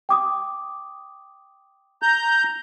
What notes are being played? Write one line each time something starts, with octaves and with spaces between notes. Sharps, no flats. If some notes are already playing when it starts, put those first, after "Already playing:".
G5 D6 D#6
A#5 G6